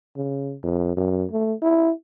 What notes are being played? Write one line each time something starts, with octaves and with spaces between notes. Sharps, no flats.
C#3
F2
F#2
A3
E4